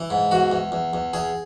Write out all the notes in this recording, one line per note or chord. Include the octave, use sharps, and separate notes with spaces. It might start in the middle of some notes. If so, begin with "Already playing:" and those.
Already playing: E3
G#2
E2 F#4
E2
E2
E2
E2 G#4